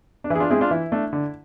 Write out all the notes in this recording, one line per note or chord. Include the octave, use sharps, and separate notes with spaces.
D4
E3 E4
G#4
D4 F4
G#3 C4 E4 G#4
D4 F4
E3 E4
A3 D4
D3